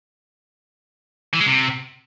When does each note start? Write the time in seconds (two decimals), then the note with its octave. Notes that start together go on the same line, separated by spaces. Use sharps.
1.34 E3
1.40 G#3
1.46 C3